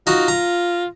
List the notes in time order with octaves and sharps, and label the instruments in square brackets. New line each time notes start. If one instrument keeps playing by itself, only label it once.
[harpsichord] D#4 F#4 [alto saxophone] F4
[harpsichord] A#5